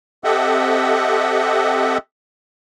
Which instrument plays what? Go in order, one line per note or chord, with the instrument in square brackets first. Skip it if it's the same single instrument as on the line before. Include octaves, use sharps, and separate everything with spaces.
[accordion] C4 G4 A4 D#5 E5 F#5